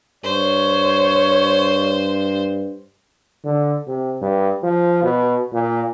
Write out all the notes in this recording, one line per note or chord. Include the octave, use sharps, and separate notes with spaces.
G2 C5 C#5
D3
C3
G2
F3
B2
A#2